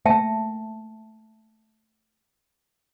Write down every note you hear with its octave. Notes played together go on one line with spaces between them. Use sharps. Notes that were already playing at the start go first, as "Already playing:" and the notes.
A3 A#3 E5 G5 A5